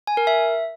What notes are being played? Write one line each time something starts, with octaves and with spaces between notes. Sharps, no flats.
G#5
A#4
E5